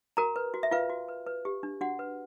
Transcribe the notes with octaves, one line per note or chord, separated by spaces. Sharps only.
F#4 A#4 A#5
B4
F#4
E5
F4 B4 F5
F#4
B4
B4
G4
D4
D4 F#4 F#5
B4